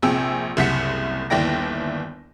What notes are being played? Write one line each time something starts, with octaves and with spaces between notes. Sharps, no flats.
A#1 C3 G#4 G5 E6
F#1 C2 F#5 B6 C#7
G1 D#2 E4 D5 G5 A#6